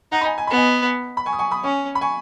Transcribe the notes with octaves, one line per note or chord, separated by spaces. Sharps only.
D#4 F#5
B5
D#5 G#5
G#5
B3 B5
D#5 G#5
B5
G#5 C#6
D#6
G#5 C#6
B5 D#6
C#4 G#5 C#6
B5
G#5 C#6